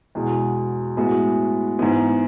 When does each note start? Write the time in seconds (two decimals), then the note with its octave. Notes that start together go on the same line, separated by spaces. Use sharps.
0.15 E2 B2 G#3
0.97 A2 G#3 B3 F#4
1.79 G#2 E3 B3